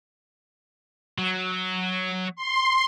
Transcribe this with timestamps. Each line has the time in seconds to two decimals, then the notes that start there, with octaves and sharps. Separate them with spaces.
1.18 F#3
2.36 C6